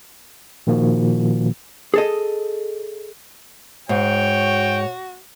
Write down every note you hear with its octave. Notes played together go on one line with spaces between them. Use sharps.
A#2 D#3 F3 A#3 F#4
G#4 A4 D#5
G#2 F#4 C#5 G5